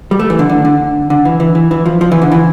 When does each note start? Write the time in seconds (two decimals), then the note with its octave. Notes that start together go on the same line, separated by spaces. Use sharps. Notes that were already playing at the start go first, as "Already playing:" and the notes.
0.11 G3
0.19 A3
0.30 E3
0.39 D3
0.49 D3
0.65 D3
1.10 D3
1.25 E3
1.40 E3
1.55 E3
1.71 E3
1.86 F3
2.01 F3
2.12 E3
2.22 D3
2.32 E3